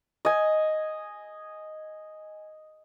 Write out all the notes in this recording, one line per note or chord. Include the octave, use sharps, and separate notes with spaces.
D#5 G#5